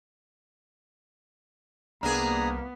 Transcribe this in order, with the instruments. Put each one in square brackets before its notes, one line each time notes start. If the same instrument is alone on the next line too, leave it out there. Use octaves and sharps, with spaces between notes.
[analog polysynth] C2 A#3 [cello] B3 [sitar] D4 G#4 [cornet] A#5